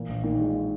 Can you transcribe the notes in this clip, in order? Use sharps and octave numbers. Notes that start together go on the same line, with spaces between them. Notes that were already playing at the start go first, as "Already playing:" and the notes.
Already playing: A#2 E3
A#1
A#2 D#3
G#3